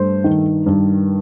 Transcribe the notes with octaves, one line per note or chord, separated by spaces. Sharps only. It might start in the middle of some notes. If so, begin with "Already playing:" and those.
Already playing: G2 A3 C5
D#3
G2